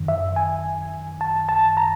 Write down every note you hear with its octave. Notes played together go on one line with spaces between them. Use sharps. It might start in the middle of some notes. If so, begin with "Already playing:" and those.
Already playing: F#2 D#3
E5
G#5
A5
A5
A#5